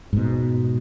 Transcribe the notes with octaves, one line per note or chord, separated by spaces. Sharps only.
G#2 B2